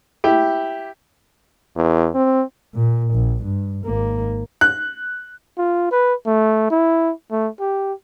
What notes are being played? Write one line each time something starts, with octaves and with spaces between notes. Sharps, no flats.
E4 G4
E2
C4
A#2
A#1
G2
G#1 A#3
F#6
F4
B4
A3
E4
A3
G4